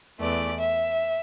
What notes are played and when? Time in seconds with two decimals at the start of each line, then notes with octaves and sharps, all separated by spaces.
0.19 E2 E3 A3 D5
0.59 E5